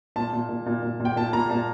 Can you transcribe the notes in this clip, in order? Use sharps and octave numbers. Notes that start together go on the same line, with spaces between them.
A#2 A5
A#2
A#2
A#2
A#2
A#2
G5
A#2 A5
A#2 A#5
A#2 A5